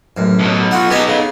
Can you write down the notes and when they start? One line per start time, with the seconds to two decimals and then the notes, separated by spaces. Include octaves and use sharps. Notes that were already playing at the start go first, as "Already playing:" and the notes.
0.17 A1 F#2
0.40 B1 B2
0.71 F4 F#4 F#5
0.91 B3 D#4 G4 G#4 D#5
1.08 C#3